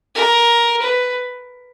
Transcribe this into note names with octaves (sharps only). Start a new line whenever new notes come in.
A#4
B4